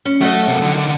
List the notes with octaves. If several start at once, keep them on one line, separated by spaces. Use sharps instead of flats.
C#4
F#3 A3 A4 D#5
C3 A#3
D3 D#3